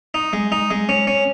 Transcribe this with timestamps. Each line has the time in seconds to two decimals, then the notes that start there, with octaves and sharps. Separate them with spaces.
0.14 D#4
0.33 G#3
0.52 D#4
0.71 G#3
0.89 C#4
1.07 C#4